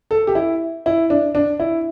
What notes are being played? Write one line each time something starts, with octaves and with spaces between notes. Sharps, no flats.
A4
G4
E4
E4
D4
D4
E4